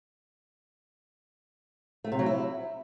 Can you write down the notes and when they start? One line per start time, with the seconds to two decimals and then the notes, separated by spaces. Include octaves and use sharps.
2.04 A3
2.12 C3
2.19 F#3
2.26 E4